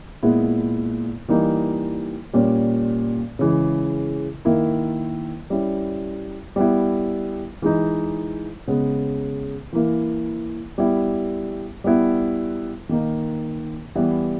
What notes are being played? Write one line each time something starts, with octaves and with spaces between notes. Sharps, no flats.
A#2 G#3 B3 E4
E3 G3 A#3 D#4
A#2 G3 C#4
C#3 E3 G#3
D#3 A#3 E4
G3 C#4 E4
G3 B3 E4
E3 G#3 D#4
C#3 G#3 B3
E3 A#3 E4
G3 B3 E4
G3 B3 E4
D#3 A#3 D#4
E3 G3 B3 E4